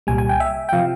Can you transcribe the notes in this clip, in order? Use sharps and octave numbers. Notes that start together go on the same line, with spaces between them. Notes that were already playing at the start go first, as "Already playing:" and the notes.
C2 A#2 G3 G#5
G#5
G5
E5
G5
C3 F3 F5